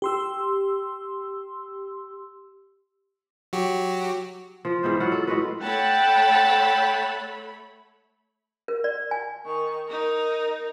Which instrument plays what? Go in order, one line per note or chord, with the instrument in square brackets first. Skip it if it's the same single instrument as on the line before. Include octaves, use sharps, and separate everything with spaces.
[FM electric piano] G4 C6 E6
[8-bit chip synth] F#3 F#4 G4
[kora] F3
G#2 E3 B3 C5
F#3 F4 F#5
A4
A2 G#3 F#4 B4
[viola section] A3 C#5 B5 [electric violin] F#5 A5 [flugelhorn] G5
[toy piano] A#4
D5
G#5
[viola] D#3 C#6
D#4 A#4